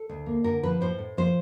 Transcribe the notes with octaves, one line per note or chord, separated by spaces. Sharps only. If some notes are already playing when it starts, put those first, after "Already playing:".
Already playing: A4
D2
A#3
D3 A#4
F3 B4
A2 C5
A2
F3 C5